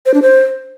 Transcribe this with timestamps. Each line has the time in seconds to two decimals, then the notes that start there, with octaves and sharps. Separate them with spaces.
0.06 C5
0.14 D4
0.22 C5